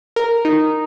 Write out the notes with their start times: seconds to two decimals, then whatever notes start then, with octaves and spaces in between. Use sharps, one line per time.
0.16 A#4
0.45 D#4